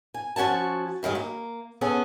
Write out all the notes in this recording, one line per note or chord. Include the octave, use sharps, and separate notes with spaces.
G#5
F3 C#4 F#4 G#5 A5
G2 D#3 F#3 G#3
A#3
B3 C#4 G#4 A4